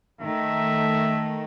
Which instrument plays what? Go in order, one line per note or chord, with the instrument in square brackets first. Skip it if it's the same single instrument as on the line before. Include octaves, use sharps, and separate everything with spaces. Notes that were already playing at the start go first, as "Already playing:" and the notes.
[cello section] D#3 A3 [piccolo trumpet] E5